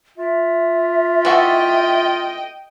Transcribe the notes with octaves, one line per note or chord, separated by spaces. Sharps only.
F4 E5
E3 F#4 A4 D#5 G5